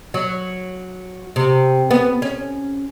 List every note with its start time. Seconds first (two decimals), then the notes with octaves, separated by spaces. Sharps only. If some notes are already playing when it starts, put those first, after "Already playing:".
0.14 F#3
1.36 C3
1.91 B3
2.22 C#4